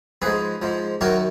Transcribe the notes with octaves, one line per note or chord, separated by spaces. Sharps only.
G#2 F3 G#4 B4
G#2 F3
F#2 D#3 F#3 F#4 A#4